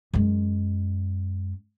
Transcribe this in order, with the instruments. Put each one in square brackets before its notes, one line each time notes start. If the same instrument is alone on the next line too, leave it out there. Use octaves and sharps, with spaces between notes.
[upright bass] F#2 G#3